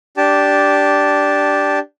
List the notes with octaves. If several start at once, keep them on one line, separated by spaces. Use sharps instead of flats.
D4 G4 A5